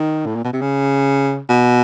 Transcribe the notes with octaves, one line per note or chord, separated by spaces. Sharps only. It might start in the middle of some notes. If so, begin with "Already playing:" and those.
Already playing: D#3
A2
A#2
B2
C3
C#3
B2